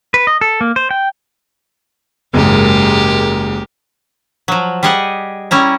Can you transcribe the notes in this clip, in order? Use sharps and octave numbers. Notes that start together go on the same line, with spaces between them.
B4
D#5
A4
A#3
C5
G5
F#1 G#2 G#3 G4 A#4
F3 F#3
G3 G4 G#4 D#5 F#5
G3 C#4 E4 A#5